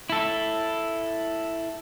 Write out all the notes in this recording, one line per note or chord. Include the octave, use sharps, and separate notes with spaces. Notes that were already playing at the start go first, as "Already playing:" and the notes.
E4 A4